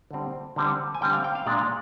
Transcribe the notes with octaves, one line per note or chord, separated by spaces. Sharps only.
D3 G3 C4
D3 G3 C4
G#5
D3 G3 C4 G5
F5
G5
F5
A#2 G#3 D4 D5